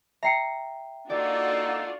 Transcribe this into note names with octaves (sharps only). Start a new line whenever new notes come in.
E5 G5 A#5 C7 C#7
A#3 D4 D#4 F4 F#4 A4 D5